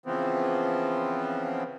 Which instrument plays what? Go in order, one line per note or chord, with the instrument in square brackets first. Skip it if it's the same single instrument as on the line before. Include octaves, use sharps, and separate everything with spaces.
[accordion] C#3 E3 F3 B3 C4